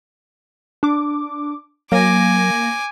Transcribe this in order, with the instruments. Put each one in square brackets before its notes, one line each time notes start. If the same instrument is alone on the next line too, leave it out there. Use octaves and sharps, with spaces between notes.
[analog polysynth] D4 D6
[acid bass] F#3 [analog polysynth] A#3 A#6 [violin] G#5 D6